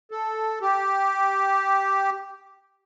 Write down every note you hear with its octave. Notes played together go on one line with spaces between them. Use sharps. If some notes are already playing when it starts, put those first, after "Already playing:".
A4
G4